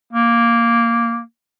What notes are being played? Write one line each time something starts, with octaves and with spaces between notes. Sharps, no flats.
A#3